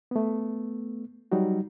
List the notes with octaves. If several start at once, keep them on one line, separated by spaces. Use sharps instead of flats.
A3 B3
F#3 G3 D#4 F#4